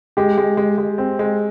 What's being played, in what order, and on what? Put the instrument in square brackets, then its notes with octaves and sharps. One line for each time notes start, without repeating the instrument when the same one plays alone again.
[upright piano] G#3 [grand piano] G4
[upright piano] G#3
G#3
G#3
C4
G#3